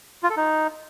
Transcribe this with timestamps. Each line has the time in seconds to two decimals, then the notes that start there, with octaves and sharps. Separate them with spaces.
0.23 F4
0.30 A4
0.37 D#4